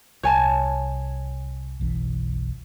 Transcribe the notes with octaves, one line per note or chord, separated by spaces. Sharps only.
C2 C#5 G#5 A5
F#1 B1 E3